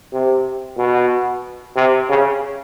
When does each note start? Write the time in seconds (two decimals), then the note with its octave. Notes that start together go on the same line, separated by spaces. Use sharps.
0.13 C3
0.77 B2
1.76 C3
2.09 C#3